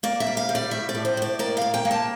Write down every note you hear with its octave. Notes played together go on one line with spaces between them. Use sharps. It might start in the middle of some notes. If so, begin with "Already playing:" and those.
A#3 D5
E5
G3
F5
G3
D5
A2 E5
D5
A2
C5
A2 D5
A#3 D5
A#3 F5
G5
A#3
A5